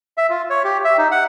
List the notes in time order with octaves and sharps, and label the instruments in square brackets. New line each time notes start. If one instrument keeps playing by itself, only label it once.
[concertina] E5
F4
C#5
G4
E5
D#4
F#5